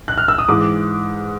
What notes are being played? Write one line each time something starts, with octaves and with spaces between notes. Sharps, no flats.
F#6
F6
E6
D#6
G#2 E3 D6